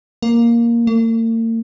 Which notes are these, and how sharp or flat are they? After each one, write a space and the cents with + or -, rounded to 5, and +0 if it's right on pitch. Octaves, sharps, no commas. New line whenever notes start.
A#3 +5
A#3 -45